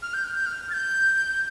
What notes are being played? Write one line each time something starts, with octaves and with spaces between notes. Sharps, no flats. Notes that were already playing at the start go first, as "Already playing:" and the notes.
F6
G6
F6
G6
F6
A6
G6